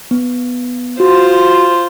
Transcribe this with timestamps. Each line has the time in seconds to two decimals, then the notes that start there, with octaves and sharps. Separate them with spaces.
0.11 B3
1.00 F4 F#4 C5